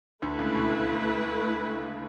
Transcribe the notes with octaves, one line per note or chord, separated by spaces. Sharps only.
D2 D3 A3 E4 B4
C#2 C#3
B2